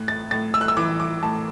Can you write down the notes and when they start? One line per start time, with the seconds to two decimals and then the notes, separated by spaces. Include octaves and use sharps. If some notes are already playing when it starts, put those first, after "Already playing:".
Already playing: A2 F#6
0.08 A6
0.31 A2 A6
0.54 E6
0.61 F#6
0.68 E6
0.77 E3 D6
1.00 D6
1.22 A2 A5